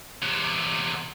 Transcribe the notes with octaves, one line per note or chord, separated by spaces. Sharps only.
E2 C3